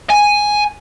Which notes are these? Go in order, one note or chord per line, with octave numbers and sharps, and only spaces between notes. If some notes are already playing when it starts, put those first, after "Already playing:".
G#5